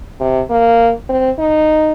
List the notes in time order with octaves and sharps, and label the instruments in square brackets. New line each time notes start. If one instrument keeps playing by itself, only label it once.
[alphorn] C3
A#3
C4
D#4